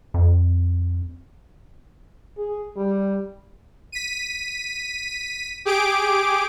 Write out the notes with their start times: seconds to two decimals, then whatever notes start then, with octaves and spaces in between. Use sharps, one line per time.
0.14 F2
2.38 G#4
2.77 G3
3.92 B6 D#7
5.65 G4 G#4 D6 D7